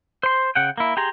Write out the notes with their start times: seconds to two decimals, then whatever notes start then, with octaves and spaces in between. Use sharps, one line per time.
0.23 C5 C6
0.55 C#3 F#5 G5
0.78 A#3 E4
0.97 G4 G#4 A#5 C6